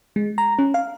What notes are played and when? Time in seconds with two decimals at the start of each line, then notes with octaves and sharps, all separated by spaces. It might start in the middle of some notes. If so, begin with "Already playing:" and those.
0.16 G#3
0.38 A#5
0.59 C#4
0.74 F5